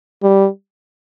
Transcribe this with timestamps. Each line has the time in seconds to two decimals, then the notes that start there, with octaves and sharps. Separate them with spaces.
0.23 G3